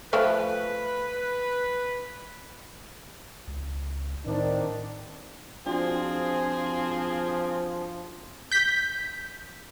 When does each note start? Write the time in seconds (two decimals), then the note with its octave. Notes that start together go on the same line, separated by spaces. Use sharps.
0.13 F3 A3 B4 G5
3.48 C#2
4.26 A2 D#3 C4 D4
5.66 F3 C4 D4 F4 F#4 G#4
8.52 G6 B6